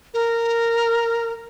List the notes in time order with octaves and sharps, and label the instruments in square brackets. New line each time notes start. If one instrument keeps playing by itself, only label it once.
[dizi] A#4